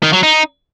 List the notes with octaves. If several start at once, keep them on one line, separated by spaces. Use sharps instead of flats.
D#3
F#3
D#4